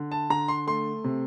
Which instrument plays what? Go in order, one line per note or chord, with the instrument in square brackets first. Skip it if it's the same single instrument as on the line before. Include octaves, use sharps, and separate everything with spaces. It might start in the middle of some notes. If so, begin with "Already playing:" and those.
Already playing: [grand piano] D3
A5
D3 A#5
C6
A3 C6
C3